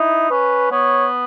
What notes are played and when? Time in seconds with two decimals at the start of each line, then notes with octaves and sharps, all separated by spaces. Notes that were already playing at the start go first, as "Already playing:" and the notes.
Already playing: D#4 E4
0.30 C#4 B4
0.71 B3 C#5